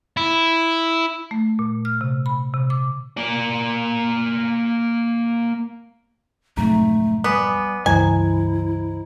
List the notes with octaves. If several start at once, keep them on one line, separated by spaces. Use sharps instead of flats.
E4
A3
A#2
F6
C3
B5
C3
D6
A#3 D5
B1 F2 G#2 A3 A#5
G3 B3 G#5 D6 D#6
C#2 G2 E3 E4 C5 D#5 G#5 A#5